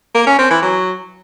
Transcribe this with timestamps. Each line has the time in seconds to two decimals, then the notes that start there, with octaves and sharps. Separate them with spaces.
0.15 A#3
0.27 C#4
0.39 C4
0.51 E3
0.62 F#3